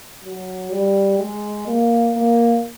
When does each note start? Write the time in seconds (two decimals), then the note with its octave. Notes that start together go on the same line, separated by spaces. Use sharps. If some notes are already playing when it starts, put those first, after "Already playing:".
0.24 F#3
0.72 G3
1.19 G#3
1.67 A#3
2.15 A#3